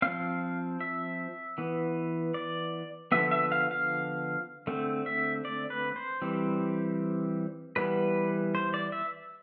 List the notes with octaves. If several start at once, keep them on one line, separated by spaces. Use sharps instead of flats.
F3 C4 F5
E5
E3 B3
D5
D3 F3 B3 E5
E5
F5
F5
D3 A3 C4
E5
D5
B4
C5
E3 G3 C4
E3 G3 B3 B4
C5
D5
E5